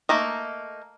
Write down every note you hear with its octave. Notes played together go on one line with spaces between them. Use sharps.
A3 A#3 D#4